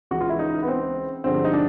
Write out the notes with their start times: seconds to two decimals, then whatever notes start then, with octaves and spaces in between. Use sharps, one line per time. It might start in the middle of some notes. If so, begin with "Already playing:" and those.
0.11 C#2 C#3 E3 F#4
0.21 F4
0.29 E4
0.39 D#4
0.62 B3
0.68 C4
1.24 G2 D3 F3 G#3 C4
1.44 D#4
1.54 D4